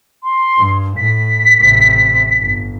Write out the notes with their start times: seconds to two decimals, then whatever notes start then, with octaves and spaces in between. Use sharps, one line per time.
0.23 C6
0.58 G2
0.97 A2 B6
1.58 A1 C3
2.38 G1